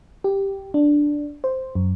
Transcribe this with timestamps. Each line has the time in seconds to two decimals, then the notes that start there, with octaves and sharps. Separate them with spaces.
0.24 G4
0.74 D4
1.44 C5
1.75 F#2